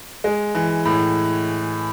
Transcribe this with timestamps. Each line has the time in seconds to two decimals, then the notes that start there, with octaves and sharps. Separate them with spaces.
0.24 G#3
0.55 E3
0.85 A2